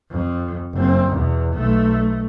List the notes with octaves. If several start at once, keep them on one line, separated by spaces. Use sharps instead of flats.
F2
F#1 C4
E2 B2
B1 A3